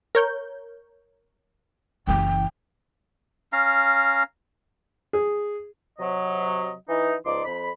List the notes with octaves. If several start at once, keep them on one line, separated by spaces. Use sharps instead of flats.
A#4 C#5 G6
F#1 E3 G5
C#4 F5 A#5
G#4
C3 F#3 D#5
E3 D#4
C#2 F3 D#4 D5 C6 D6
F2 B5